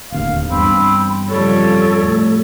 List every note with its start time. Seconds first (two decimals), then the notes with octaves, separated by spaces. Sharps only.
0.12 D1 D#2 D3 F5
0.50 E2 G2 C4 D4 B5
1.29 F2 C#3 G3 A4 C#5
2.01 A2